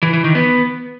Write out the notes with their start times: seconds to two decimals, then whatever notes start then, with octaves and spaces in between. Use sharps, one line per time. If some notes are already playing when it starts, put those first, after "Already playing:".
0.03 E3
0.13 E3
0.24 D#3
0.35 B3